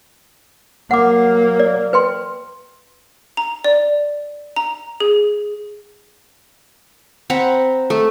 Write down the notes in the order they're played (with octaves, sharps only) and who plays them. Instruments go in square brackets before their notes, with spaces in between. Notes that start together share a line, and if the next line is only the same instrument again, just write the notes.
[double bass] F#3 A#3 [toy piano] F#5 D6
[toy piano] D5
B4 G5 C6
[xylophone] A#5
D5
A#5
G#4
[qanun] C4 F#5 A#5 B5
A3